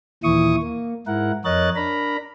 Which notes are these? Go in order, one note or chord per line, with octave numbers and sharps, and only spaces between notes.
D#2 A#2 E3 E4 C#6 D#6
A#3
G#2 E4 A#4 F#5
F2 A#4 C#5 D#5 F#6 A6
D4 A#4 A#5 B5